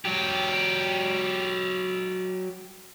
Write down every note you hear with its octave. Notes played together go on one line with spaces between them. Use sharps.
F#3 G4